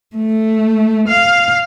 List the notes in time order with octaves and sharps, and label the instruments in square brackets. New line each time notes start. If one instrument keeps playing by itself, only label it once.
[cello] A3
F5